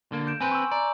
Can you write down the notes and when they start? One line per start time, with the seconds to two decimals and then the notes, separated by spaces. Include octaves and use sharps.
0.12 D3 A#3
0.27 G6 D7 E7
0.40 C4 B4 G#5 C6
0.52 C#6 E6
0.71 D5 A#5